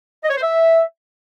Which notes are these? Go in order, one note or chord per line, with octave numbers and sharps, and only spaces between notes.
D#5
C#5
C5
E5